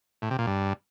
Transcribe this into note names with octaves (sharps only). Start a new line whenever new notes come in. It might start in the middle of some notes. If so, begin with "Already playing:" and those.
A2
C3
A#2
G2